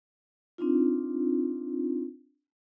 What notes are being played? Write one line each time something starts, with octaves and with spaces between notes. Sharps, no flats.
C4 D4 D#4 F4